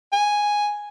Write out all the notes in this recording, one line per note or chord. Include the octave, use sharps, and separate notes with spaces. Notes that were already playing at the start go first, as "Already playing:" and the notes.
G#5